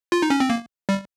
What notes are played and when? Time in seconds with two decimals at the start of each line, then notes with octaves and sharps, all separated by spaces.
0.12 F4
0.22 D#4
0.30 C#4
0.40 C4
0.50 A#3
0.89 G3